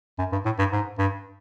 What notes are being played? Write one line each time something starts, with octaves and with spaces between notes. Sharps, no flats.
F#2
G2
A2
G2
G#2
G2